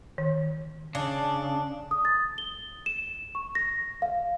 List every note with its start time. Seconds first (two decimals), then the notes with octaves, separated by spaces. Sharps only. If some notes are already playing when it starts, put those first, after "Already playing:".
0.18 D#3
0.95 C#3 D4
1.91 D#6
2.05 A6
2.38 G7
2.86 E7
3.35 C#6
3.55 A#6
4.02 F5